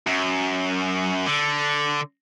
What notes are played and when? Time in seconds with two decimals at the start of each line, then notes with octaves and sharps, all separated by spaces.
0.07 F#2
1.26 D3